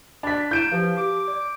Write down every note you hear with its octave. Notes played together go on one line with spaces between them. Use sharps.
D4 B5 A6 B6
E4 G6 D7 E7
F3 G4 B4 F5
G4 D6
D5